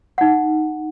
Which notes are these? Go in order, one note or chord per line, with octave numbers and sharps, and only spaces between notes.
D#4 F#5